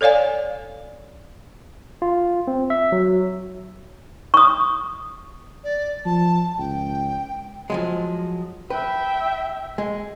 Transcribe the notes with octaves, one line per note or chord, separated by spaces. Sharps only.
A4 C#5 D5 F5 G#5
F4
C4
E5
F#3
C#6 D#6
D5
F3 A5
C#2 G5
F3 F#3 G#3
B4 E5 G5
G#3